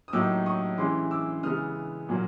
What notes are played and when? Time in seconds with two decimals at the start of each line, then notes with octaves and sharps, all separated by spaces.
0.08 D#6
0.13 A2 F#3 A#3 D#4 D6 E6
0.46 C#6 D#6
0.78 E3 G#3 C#4 E4 C6 D6
1.11 D6 E6
1.43 C#3 E3 G#3 B3 D#6 F6
2.09 A#2 F#3 A#3